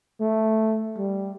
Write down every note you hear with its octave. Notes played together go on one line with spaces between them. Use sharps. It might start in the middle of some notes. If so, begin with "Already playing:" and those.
A3
G3